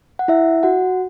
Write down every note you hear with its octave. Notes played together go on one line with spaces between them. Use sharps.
F#5
E4 E5
F#4 F#5